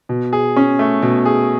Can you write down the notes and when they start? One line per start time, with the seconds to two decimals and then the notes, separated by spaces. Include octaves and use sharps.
0.09 B2
0.33 G#4
0.56 C#4
0.79 A3
1.02 B2
1.25 G#4